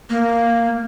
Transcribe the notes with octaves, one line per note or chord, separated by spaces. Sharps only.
A#3